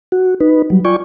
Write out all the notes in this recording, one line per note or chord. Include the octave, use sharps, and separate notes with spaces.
F#4
D#4 B4
F#3 G3
F4 D5 G5 G#5 C#6